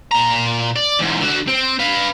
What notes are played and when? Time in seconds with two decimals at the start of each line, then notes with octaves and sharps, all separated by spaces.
0.11 A#2 A#5
0.76 D5
1.00 E2 G#2
1.21 D3 F#4
1.48 C4
1.79 B4 F5